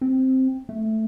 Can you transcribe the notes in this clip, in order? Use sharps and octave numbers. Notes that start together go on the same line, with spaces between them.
C4
A3